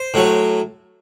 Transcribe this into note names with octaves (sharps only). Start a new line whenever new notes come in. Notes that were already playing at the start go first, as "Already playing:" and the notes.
Already playing: C5
A2 F#3